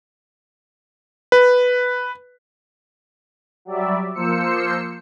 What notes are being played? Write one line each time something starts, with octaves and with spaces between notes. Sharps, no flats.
B4
F#3 G3 D5 E5
F3 A#3 C5 E6 C#7